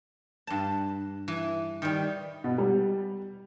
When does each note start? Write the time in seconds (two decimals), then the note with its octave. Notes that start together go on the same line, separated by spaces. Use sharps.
0.47 G2 A5
1.28 E3
1.82 D#3 G3
2.44 B2
2.58 G3